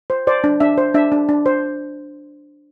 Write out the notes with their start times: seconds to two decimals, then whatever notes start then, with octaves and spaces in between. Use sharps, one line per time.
0.10 C5
0.27 C5 D5
0.44 D4
0.60 D4 E5
0.78 C5
0.94 D4 E5
1.12 D4
1.29 D4
1.46 C5